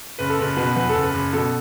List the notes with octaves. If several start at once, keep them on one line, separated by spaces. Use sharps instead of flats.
F#1 B4
A4
F#1 B4
B2 B4
E2 B4
A4
F#1
B4
F#1
B2 A4